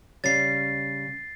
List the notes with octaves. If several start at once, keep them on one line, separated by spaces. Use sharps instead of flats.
C#3 G3 C#4 A6 C7